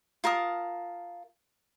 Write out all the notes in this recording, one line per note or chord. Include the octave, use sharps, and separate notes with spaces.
F4 A#4 A5 D#6